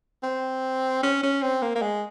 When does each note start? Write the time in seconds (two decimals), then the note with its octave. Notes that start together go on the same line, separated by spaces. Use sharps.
0.23 C4
1.03 C#4
1.23 C#4
1.42 C4
1.62 A#3
1.75 A#3
1.82 G#3